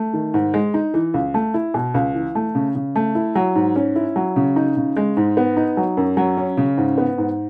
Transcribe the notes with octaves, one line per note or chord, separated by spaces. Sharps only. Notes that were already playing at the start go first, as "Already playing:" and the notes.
Already playing: A3
D#3
G#2
G#3
D#4
E3
C#2
A3
E4
B2
C#2
E3
A3
C#3
C#3
A3
E4
F#3
G#2
C#4
E4
F#3
C#3
D#4
C#3
G#3
G#2
B3
D#4
F#3
F#2
F#3
C#4
C#3
G#2
B3
G#2